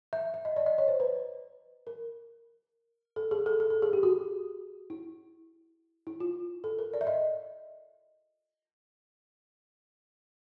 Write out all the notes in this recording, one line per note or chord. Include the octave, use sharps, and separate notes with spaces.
E5
E5
D#5
D5
D#5
C#5
C5
B4
A#4
A4
G#4
A4
A4
A4
G#4
G4
F#4
E4
E4
F4
A4
A#4
D5
E5
D#5